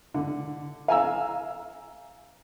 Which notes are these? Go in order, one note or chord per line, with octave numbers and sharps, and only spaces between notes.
D3
F5 G#5 A#5 E6